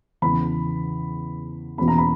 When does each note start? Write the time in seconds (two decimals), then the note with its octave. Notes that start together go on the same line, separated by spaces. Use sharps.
0.22 E2 C#3 E3 B5
1.78 E2 B2 A#3 C#4 B5
1.88 A#5
1.98 B5